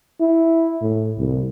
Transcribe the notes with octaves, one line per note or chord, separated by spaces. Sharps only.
E4
A2
C2